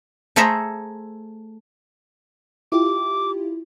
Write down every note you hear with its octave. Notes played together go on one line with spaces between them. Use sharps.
A3 G#4 A4 C5 E5 A#5
E4 F4 G4 D6